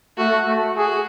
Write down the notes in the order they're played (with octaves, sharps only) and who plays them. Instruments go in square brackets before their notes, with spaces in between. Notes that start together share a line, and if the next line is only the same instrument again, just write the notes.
[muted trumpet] A3 [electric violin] F#4
[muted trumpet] A3
[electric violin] F#4 [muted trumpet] G#4